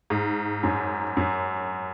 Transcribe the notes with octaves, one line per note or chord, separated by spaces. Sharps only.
G#2
F#2
F#2